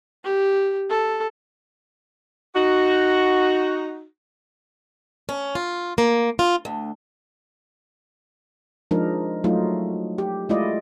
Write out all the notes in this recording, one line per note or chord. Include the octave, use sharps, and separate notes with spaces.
G4
A4
D#4 F#4
C#4
F4
A#3
F4
D2
F3 G#3 D4 D#4 A#4
F#3 A3 D#4 F4
G4
G#3 A3 E4 F4 D5 D#5